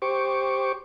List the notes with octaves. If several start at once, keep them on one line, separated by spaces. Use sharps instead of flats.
G4 C5 C#6 D6